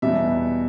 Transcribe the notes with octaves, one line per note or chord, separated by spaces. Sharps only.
E2 B2 G3 E5